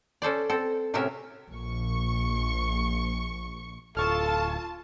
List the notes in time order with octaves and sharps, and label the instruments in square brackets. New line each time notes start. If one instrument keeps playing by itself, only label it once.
[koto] C#4 A4 C5 D5
C4 A4
A2 C3 F#3 C#4 A#4 E5
[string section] A#1 C#6
[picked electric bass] D1 [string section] F4 A5 [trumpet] A4 [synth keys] C#6 F6